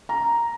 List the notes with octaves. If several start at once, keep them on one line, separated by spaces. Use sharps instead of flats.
A#5